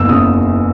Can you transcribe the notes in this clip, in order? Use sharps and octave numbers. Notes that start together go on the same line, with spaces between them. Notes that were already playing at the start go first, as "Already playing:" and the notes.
Already playing: F#1 E2 E6
C#3 D#6